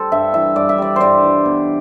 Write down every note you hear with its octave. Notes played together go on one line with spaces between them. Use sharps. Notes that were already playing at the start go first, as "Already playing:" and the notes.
Already playing: G3 A4 C5
G2 E5
E3 E5
G2 D5
E5
G3 D5
G2 C5 D5
E3
B2